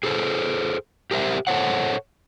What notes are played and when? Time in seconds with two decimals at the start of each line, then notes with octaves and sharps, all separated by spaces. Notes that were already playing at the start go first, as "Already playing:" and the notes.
0.03 G#4 A4 C5
1.11 G4 A#4 C5 E5
1.47 A4 C5 C#5 F#5